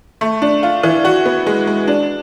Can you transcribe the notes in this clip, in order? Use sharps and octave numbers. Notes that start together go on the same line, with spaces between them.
A3
D4
F4
E3
F#4
B3
G#3
G#3
D4